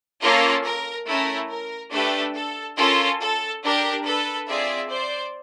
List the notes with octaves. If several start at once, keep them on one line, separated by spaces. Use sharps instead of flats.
A#3 C#4 F4 A4 A#4
A#4
A3 C#4 E4 A#4
A#4
A3 D4 G4 A4 B4
A4
C#4 F4 A4 A#4
A4
D4 G4 A#4
A4 B4
C4 F4 G#4 D5 E5
C5 D5